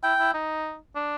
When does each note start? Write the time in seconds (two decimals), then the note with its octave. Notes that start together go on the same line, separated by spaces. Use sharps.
0.03 E4 G5
0.19 E4
0.34 D#4
0.96 D4